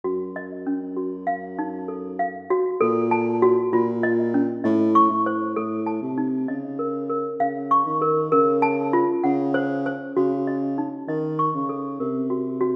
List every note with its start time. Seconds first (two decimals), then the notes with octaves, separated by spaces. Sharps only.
0.04 F#2 F#4
0.36 D#5
0.67 C#4
0.97 F#4
1.27 F5
1.59 D#4
1.88 A4
2.19 F5
2.50 F#4
2.81 A#2 A4
3.11 A5
3.42 F#4
3.73 A#2 F4
4.03 D#5
4.34 C#4
4.64 A2 D#5
4.95 C#6
5.10 A2
5.26 C5
5.56 A2 A4
5.86 A5
6.02 C3
6.18 D#4
6.48 C#3 D#5
6.79 A#4
7.09 A#4
7.40 C#3 F5
7.71 C#6
7.86 D#3
8.02 A#4
8.32 C#3 A#4
8.62 A5
8.93 F4
9.24 C#3 F#5
9.54 C5
9.86 C5
10.16 C#3 F#4
10.47 D#5
10.78 D#4
11.08 D#3 D#5
11.39 C#6
11.54 C#3
11.69 A4
12.00 C3 A#4
12.30 F#4
12.61 F#4